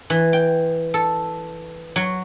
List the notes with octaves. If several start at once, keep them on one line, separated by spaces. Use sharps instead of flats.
E3
G5
A4
F#3